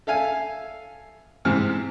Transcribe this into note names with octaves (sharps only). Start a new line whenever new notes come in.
A4 E5 F5 G#5
G#2 C3 E3 C4 F6